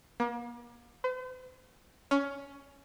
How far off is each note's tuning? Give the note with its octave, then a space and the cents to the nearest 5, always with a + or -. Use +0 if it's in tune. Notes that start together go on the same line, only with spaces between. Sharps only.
A#3 +40
C5 -45
C#4 +15